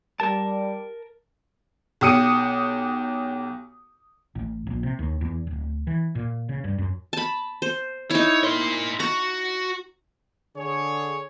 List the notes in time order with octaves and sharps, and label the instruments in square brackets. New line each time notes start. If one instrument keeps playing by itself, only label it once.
[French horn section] G3 [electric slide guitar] A#4 A5
[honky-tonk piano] B1 G4 D#6 C#7 D#7
[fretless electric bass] A1
A#1
C3
D#2
E2
D1
E3
A#2
C#3
G2
F#2
[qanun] A5 B5
C5
[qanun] D#4 E4 [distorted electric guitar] C#5
[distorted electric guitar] A#4 C6
[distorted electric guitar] F#4 [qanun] A#5
[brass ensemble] D3 G#4 C#5